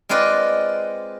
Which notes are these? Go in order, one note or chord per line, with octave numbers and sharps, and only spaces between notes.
G#3 C4 F4 B4 D5 D#5